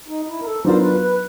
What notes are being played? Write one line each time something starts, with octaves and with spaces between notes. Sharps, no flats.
D#4
E4
A#4
A4
F#3 B3 D4 F4 A#4 C5
B4
B4